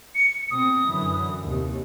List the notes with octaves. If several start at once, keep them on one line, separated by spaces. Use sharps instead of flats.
C#7
B2 C4 D#6
F#2 D3 E3
D#2 C3